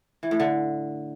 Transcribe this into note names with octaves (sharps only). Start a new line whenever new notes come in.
E3
A2
D3